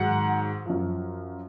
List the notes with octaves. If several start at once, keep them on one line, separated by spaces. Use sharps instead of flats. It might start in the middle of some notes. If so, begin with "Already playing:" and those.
Already playing: G#2 D#3 F#3 F#5
F#2 F3